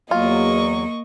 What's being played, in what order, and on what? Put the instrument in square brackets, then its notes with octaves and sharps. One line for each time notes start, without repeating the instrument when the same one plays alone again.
[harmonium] E2 F#3 [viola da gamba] A#3 [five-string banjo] F4 [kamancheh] D#5 C#6